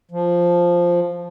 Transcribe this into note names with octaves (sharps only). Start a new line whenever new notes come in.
F3